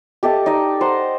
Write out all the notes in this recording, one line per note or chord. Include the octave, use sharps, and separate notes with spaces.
G4 A4 D#5 E5
D#4 D5 D#5
C5 F#5 A#5